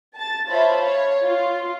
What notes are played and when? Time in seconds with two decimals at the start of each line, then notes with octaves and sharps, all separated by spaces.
0.15 A5 A6
0.49 F4 C5 C#5 E5 A5 B5
0.80 C#5 F5
1.23 F4